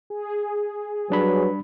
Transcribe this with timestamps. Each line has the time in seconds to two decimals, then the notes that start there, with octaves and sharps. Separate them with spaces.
0.10 G#4
1.10 F#3 G3 D4 B4 B5